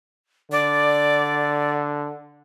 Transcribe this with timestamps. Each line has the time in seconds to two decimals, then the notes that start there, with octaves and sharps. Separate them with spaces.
0.52 D3 D5